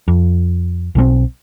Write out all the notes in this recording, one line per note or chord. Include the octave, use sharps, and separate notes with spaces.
F2
B1 B2 F3 C4